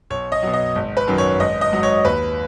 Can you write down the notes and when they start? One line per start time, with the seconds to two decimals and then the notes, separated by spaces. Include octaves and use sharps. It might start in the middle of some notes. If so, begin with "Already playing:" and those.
0.10 B1 C#5
0.32 D#5
0.43 B2 F#3
0.53 D#5
0.75 G#1
0.97 B4
1.07 F#2 D#3 F#3
1.18 C#5
1.40 G#1 D#5
1.61 D#5
1.72 G#2 F#3
1.83 C#5
2.05 D#2 B4